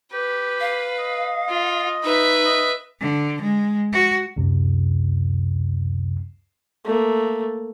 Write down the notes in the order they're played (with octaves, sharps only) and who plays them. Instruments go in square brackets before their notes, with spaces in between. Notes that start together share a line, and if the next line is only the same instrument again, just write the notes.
[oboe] G4 [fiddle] B4
[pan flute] F5
[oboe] D#5
[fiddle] F4
[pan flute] D#4 [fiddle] B4 E5
[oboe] D#5
[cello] D3
G#3
F#4
[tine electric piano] C#2 F#2 C3
[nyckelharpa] A3 A#3